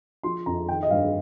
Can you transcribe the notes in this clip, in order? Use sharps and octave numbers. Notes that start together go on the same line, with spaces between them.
F3 C6
F2 A#5
D#3 G5
D#5
G2 F5